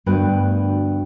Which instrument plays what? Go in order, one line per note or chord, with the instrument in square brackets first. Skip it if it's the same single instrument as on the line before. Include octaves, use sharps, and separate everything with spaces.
[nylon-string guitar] D2 G2 B3 F#4 B4 G5